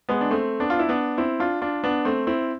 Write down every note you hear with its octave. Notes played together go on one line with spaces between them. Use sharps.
G#3 B3
D4
A3 C4
B3 D4
F4
E4
B3 D4
C4 E4
D4 F4
D4 F4
B3 D4
A3 C4
C4 E4